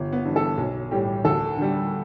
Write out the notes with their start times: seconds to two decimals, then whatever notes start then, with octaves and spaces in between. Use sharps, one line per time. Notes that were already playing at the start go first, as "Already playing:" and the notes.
Already playing: G1
0.12 B3
0.25 G2 E3
0.36 A4
0.58 B1
0.91 A2 G3 G4
1.25 D2 A4
1.57 D3 G3